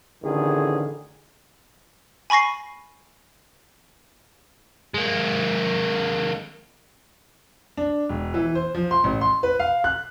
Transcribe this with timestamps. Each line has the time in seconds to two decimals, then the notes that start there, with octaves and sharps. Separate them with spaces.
0.23 A1 D3 D#3 G#4
2.30 G#5 B5 C#6 A#6 C7
4.94 G#3 A#3
7.77 D4
8.09 E1
8.34 E3
8.55 C5
8.75 F3
8.91 C6
9.04 A1
9.21 C6
9.43 B4
9.60 F5
9.84 F#6